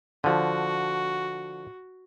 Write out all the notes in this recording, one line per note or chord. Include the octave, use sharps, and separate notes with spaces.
D3 F3 F#4